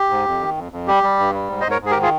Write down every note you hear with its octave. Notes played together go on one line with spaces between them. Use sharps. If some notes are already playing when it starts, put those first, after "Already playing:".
Already playing: G4
G#2
F2
D#3
F2
F2
G3 G4
G3
G2
G3
G#2
C5 D#5
G#2
A#4 C#5
G#2 G#4
G4 A#4
D#3
F4 G#4